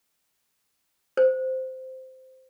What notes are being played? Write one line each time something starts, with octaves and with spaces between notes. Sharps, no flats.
C5